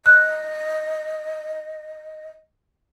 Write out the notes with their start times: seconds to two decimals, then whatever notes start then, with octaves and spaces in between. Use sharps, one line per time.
0.06 D#5 F#6